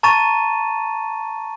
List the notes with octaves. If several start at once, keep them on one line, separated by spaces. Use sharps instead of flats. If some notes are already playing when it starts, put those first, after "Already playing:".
A5 A#5 C#6 A6 D#7 E7